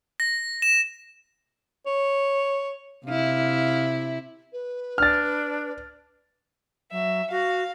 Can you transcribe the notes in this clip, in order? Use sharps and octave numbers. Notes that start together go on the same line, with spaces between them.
A#6
E7
C#5
C3 E4 F5
B4
D4 F6 A6
F#3 E5
F#4 F5